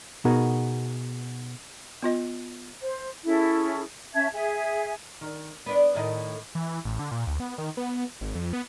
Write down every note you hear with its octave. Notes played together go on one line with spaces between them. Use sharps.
B2 B3 D#4 F#4 G#4 A#4
B3 F4 D#5
C5
C#4 E4 G#4 A4
C#4 E5 A5 G#6
G#4 E5 G#5
D#3
B3 D4
A2 D#3 D#5
E3
A1
D3
A#2
D2
B3
D#3
B3
G#1
F2
B3